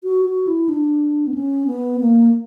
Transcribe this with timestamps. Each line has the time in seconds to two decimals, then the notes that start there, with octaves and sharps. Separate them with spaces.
0.04 F#4
0.25 F#4
0.47 E4
0.69 D4
1.27 B3
1.34 C#4
1.67 B3
2.00 A#3